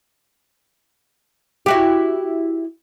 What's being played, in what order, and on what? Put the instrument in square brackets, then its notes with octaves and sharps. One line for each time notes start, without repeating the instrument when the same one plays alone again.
[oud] E4 F#4 G4